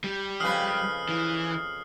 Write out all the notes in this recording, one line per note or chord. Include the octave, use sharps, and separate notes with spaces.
G3
F2 C#3 B4 D#6 F6 C7
E3